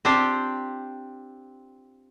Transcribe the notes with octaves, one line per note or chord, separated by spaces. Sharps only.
C4 D4 F4 G4 C5